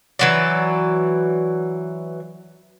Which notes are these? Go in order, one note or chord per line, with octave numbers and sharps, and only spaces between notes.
E3 F#3 D5